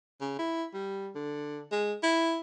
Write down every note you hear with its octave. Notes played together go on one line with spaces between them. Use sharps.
C#3
E4
G3
D3
G#3
E4